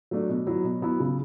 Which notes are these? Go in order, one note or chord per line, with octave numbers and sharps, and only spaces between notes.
F#3 A3 D4
B2
F#3 B3 E4
B2
F#3 B3 E4
C#3